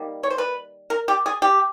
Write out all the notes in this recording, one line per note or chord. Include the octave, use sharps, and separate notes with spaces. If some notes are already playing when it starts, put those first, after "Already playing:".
Already playing: D#3 G3 A#3
C#5
C5
B4
A#4
G4
G#4
G4